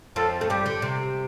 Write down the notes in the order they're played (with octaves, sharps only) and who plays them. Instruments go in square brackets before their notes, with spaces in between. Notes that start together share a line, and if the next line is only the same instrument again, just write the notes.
[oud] F2 F3 [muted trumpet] A4
[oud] A3
[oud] G2 G3 [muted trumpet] G4
[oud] D3
C3